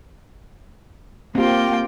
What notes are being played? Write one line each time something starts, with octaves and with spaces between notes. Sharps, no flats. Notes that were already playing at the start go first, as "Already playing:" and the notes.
A#3 C4 F4 G4 G5